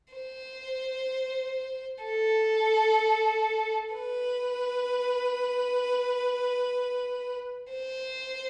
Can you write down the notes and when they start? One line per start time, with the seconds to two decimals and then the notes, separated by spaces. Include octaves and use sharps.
0.14 C5
2.04 A4
3.94 B4
7.73 C5